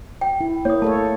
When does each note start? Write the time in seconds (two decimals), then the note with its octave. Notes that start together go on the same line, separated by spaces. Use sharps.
0.21 G5
0.41 E4
0.65 A#3 E4 C#5 D#6
0.82 A3 A4 C#5 A5